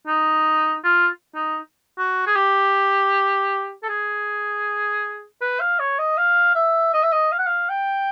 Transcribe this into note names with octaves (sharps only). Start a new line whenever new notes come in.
D#4
F4
D#4
F#4
G#4
G4
A4
G#4
B4
F5
C#5
D#5
F5
E5
D#5
E5
D#5
F5
F#5
F5
G5